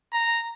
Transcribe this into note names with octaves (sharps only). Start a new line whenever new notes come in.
A#5